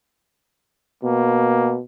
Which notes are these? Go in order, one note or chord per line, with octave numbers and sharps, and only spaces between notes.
B2 A#3